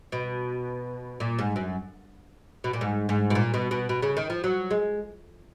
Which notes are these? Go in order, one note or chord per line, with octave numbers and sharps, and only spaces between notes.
B2
A#2
G#2
F#2
B2
A#2
G#2
G#2
B2
A#2
B2
B2
B2
C#3
D#3
F3
F#3
G#3